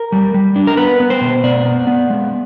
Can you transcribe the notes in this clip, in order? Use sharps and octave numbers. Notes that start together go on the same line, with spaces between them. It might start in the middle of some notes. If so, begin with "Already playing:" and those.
Already playing: A#4
G3
G3
D4
A#4
B3 B4
B3
C5
B2
B3 D5
B3
B3
G#3